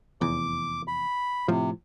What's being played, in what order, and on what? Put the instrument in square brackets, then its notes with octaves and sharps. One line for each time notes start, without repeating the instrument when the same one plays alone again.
[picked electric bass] F1 E2 [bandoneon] D6
[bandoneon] B5
[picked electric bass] A2 F3 [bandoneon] C3